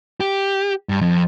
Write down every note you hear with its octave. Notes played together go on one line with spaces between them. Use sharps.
G4
G2
F2